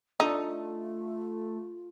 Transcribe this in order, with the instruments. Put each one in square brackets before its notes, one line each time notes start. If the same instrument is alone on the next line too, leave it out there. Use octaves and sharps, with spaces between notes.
[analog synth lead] A3 [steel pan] D4 A4 [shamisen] D#4 [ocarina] F4